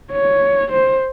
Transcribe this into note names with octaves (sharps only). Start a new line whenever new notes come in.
C#5
C5